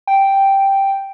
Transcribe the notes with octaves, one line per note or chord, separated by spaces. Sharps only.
G5